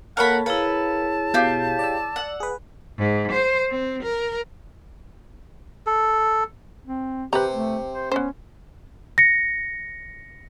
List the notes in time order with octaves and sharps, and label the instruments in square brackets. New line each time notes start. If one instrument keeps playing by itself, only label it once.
[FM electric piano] A#3 C#5 F5 [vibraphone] A4 A5 [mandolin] A#4 B5 [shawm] F#5
[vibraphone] E4 G#4 C#5 [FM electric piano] A#4 F5 [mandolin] B4 [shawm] A5
[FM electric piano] B2 [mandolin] G4 F5 G6
[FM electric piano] D5 E6
[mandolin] F#5
[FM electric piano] G#4 B4
[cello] G#2
C5
C4
A#4
[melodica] A4
[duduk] C4
[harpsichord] C3 [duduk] G4 [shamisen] B4 A#5
[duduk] A3
C5
[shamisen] B3 C5 [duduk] C#4
[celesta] A#6 C#7